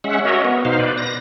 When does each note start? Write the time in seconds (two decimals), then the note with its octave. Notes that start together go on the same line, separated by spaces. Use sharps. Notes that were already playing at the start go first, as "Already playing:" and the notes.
0.04 G#3 C#4 E5 F#5
0.25 F#4 A#4 C#5 D#5 E5
0.45 B3
0.65 B2 D#4 C5 F5
0.79 B4 D5
0.98 A#6